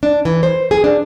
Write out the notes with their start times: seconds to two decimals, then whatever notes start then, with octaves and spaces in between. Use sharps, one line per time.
0.03 D4
0.25 E3
0.43 C5
0.71 G#4
0.84 D4